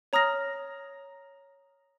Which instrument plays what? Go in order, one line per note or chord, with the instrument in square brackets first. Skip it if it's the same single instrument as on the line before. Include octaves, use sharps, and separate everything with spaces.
[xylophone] C#5 A#5 D#6 F6 A#6